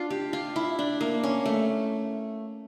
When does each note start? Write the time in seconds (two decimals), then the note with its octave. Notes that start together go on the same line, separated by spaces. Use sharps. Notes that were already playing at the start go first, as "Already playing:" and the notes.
Already playing: D4 F4
0.10 G4
0.33 F4
0.56 E4
0.79 D4
1.01 A#3
1.24 C#4
1.46 A3